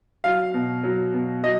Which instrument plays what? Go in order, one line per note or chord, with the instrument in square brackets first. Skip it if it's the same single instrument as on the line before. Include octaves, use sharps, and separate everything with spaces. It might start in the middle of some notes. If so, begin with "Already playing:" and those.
[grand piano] F#3 F5
B2
F#3
B2
F#3 D#5